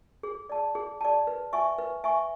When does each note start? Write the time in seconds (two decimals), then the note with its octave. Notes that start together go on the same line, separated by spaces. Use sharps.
0.23 G#4
0.49 D5 A5
0.75 G#4
1.01 D5 A5
1.27 B4
1.53 E5 G#5 C#6
1.78 B4
2.04 E5 G#5 C#6